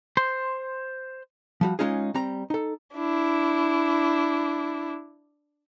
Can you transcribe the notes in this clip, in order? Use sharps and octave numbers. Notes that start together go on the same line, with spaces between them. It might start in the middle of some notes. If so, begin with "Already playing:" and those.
C5 C6
F3 G3 F#4
G#3 C#4 D#4 F4 G#4
G3 C4 A#5
D#4 A4
D4 E4